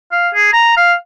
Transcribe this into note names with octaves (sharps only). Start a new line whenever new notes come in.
F5
G#4
A#5
F5